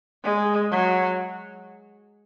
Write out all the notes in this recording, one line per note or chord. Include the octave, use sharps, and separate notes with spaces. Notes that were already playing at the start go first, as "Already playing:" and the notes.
G#3
F#3